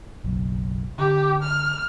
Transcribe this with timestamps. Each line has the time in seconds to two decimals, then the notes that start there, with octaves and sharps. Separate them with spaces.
0.24 F#1 B1
0.98 D3 G4
1.43 F6